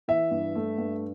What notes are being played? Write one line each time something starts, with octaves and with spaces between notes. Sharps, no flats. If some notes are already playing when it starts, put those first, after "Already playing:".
E3 E5
G2
A3
G2